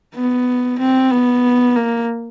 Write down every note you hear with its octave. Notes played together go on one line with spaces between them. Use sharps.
B3
C4
B3
A#3